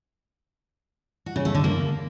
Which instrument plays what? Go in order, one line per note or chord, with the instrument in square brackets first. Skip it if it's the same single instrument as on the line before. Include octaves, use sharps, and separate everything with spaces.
[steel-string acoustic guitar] F#4
C#3
A3
D3
A#3